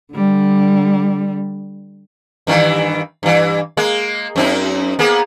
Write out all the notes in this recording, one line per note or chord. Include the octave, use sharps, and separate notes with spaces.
D3 G3
G2 D#3 E3
G2 E3
G#3 A#3
F#2 C4 D#4
A#3 B3 G#4